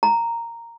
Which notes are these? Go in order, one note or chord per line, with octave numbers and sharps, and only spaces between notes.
A#5